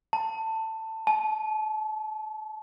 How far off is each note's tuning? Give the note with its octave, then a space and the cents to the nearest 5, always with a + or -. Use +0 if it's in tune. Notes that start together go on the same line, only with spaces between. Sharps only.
A5 +15
A5 -35